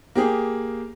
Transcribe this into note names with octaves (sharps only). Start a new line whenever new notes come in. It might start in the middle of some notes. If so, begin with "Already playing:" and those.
A#3 G4 G#4